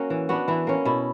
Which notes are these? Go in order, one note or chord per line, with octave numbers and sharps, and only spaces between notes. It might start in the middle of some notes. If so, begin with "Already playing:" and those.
Already playing: A#3 C#4 F#4
E3
B3 D4 F#4
E3 E4
A#3 C#4
B2 E4